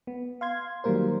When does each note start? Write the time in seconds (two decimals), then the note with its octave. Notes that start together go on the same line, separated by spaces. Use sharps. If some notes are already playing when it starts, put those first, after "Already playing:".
0.07 B3
0.41 F5 C6 G#6
0.84 D#3 F#3 G3 A#3 A#4 C5